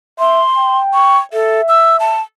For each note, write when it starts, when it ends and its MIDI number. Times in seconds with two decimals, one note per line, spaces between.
0.19 0.43 76
0.19 0.78 84
0.57 1.23 79
0.94 1.18 85
1.33 1.61 69
1.33 2.16 76
1.69 1.96 88
2.00 2.21 81